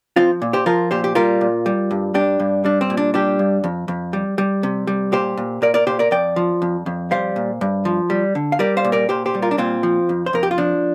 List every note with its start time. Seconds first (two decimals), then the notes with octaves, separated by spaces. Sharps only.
0.16 F3 C4 F4
0.42 A#2
0.53 G4 C5
0.66 F3 F4 A#4
0.91 A#2 G4 C5
1.04 G4
1.15 G3 F4 A#4
1.41 A#2
1.66 G3
1.91 G2
2.14 G2 D4 G4
2.40 G2
2.65 G3 D4
2.81 C4
2.90 A#2
2.97 D4
3.14 G3 D4 G4
3.39 G2
3.64 F2
3.88 F2
4.13 G3
4.38 G3
4.63 C3
4.87 G3
5.12 A#2 G4 C5
5.37 A#2
5.62 A#2 A#4 D5
5.74 A#4 D5
5.87 A#2 G4 C5
5.99 A#4 D5
6.11 F2 D5 G5
6.36 F3
6.62 F2
6.86 F2
7.11 G3 C5 F5
7.36 A#2
7.61 G2
7.85 F3
8.10 G3
8.35 D3
8.52 F5
8.59 G3 A#4 D5
8.77 C5 F5
8.84 A#2
8.92 A#4 D5
9.09 A#2 G4 C5
9.26 G4 C5
9.35 G3
9.42 F4 A#4
9.51 D4
9.58 A#2 C4 F4
9.83 F3
10.09 F2
10.26 C5
10.33 F2 A#4
10.43 G4
10.51 F4
10.58 F3 D4